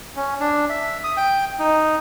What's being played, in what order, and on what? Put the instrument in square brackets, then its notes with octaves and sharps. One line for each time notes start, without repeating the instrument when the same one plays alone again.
[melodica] C#4
D4
E5
D#6
G5
D#4